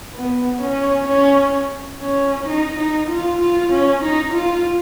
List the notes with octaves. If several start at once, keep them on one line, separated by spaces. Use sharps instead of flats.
B3
C#4
C#4
C#4
D#4
D#4
F4
F4
C#4
D#4
F4